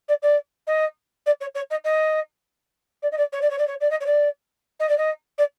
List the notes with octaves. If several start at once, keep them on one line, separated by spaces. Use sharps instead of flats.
D5
D5
D#5
D5
C#5
C#5
D#5
D#5
D5
D#5
D5
C#5
D5
C#5
D5
C#5
D5
D#5
C#5
D5
D#5
D5
D#5
D5